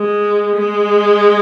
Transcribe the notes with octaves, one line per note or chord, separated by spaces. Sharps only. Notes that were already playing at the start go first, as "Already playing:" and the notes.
Already playing: G#3
G#3